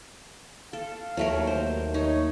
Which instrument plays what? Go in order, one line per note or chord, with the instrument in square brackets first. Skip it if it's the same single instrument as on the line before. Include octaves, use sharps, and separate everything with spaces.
[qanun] A4 [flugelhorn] F5
[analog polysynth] D#2 [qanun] F#3 A3 A#4
[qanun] C5
[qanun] D#4 [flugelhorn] C#5